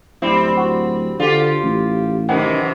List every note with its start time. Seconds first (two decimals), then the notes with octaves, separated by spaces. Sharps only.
0.22 D1 G3 C4 E4
0.57 F#4
1.20 D3 F4 G4
1.63 A1
2.29 F#2 C3 D#3 E3 F#5